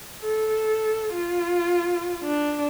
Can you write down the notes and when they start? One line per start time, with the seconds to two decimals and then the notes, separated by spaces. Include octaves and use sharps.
0.23 A4
1.14 F4
2.24 D4